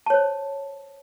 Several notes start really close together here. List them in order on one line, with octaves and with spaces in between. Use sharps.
A5 C#5 C5